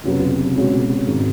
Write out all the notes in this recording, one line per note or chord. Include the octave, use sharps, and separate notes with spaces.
F1 F2 C#3 F#3 B3
B1 B2 G#3 C#4 F#4
G#1 G#2 D#3